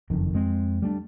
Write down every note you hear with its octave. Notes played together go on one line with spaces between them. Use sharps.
F#1 F2 D#3
F2 G#3 C4
G3 A3 C#4 D4